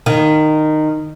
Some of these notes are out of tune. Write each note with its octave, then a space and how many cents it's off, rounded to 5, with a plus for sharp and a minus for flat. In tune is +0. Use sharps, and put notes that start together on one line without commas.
D#3 -15